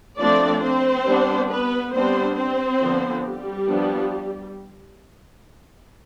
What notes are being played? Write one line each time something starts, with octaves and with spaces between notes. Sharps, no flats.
F3 A3 C4 D4 D5
C4 C5
G3 B3 D4
B3 B4
G3 B3 C4 D4 C5
C4 C5
D3 F3 B3
G3 G4
F3 B3 D4